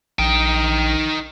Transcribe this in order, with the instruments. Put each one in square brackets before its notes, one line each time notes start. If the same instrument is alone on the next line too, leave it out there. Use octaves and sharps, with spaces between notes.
[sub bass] A#1 [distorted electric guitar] D#4 G5